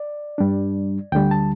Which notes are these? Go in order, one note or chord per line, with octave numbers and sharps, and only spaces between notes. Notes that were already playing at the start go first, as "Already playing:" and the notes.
Already playing: D5
G2 G3 D4
D2 D3 G3 G5
A5